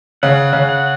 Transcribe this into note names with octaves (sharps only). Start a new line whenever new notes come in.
C#3 F#5
C#3
F#5